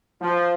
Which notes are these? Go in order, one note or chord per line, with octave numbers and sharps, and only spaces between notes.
F3